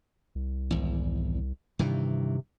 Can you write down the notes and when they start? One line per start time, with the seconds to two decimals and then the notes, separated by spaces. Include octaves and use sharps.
0.35 C2
0.71 G#1 E2
1.79 G2 C3 D#3 E3